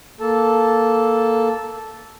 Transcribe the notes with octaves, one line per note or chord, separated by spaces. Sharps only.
A#3 A4 A5